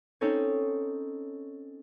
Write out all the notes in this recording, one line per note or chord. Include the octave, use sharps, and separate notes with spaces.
C4 C#4 D#4 A4 C#5